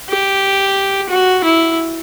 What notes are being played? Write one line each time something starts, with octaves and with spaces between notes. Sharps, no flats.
G4
F#4
E4